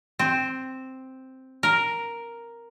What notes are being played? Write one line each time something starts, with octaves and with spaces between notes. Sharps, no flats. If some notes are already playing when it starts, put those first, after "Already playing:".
C4
A#4